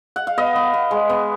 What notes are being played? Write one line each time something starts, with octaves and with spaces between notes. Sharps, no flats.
F#5
F5
B3 D#5
B3
B3
G#3
B3